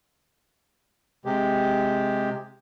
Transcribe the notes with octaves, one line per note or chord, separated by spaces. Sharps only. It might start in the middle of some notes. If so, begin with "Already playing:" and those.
C3 G#3 G4